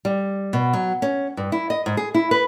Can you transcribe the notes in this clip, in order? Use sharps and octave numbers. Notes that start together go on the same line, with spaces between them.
G3
B2
F#3
C#4
G2
E4
D#5
G#2
G#4
E4
B4